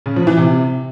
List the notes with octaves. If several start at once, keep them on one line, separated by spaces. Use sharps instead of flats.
C#3
F3
E3
C3